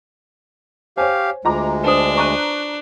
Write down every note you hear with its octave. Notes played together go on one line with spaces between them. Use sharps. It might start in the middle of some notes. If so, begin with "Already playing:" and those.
G4 C5 C#5 F5 G#5
D2 G#3 F4 D#5 A#5 D6
D4 B4 C5 A5 D#6
A#5 C#6 F#6 D#7